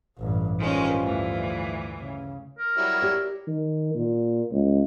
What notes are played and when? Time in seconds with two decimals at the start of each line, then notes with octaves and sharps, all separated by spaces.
0.18 A1 G2
0.59 G2 D#3 F3 G#3 C#4
1.01 D2 E3
2.00 C#3
2.58 A#4
2.78 F#3 G3 E4
3.02 G4 D5
3.47 D#3
3.95 A#2
4.52 C#2